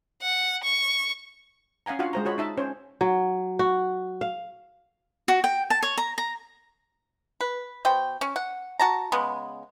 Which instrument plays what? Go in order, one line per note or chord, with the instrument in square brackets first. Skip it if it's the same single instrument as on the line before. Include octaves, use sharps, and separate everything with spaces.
[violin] F#5
C#6
[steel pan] C#4 F5 F#5 G#5 A#5
D4 F4 F#4 F5 F#5
G#3 C5 A#5
F4 F#4 C#5 B5
D#4 E5 A5
C#4 C5 C#5
[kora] F#3
F#4
F5
[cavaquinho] F#4
G5
A5
C#5
A#5
A#5
[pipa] B4
B2 C5 G5
C#4
F#5
F#4 A5 A#5
C#3 G#3 B3